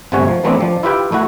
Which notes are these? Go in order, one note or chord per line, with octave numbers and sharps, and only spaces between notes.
G1 C3 A3 C#4 F#4 C#5
F3
E3 F#3 A3 B3 C4 D4
F3 D4
E4 F4 G4 B4 E5 G5
A3 E4 F#4